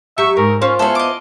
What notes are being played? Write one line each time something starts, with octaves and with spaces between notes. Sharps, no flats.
F#3 G4 E5 C#6
G#2 D#3 A#4
C#4 F4 C5
B3 E4 G#4 A4 C5
D#5 D6